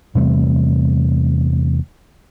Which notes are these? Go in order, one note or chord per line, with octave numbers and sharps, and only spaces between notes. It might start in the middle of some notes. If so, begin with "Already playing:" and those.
E2 C3 G3 A3